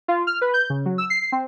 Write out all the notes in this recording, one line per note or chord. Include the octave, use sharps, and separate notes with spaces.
F4
F6
B4
G6
C#3
F#3
E6
C7
C4